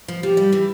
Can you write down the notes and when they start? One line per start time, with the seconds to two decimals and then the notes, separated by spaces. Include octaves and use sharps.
0.08 F3
0.23 F3 G4
0.37 G3
0.52 E3